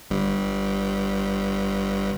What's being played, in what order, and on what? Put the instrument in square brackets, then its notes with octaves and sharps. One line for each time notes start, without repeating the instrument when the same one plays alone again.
[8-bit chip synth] G1 G2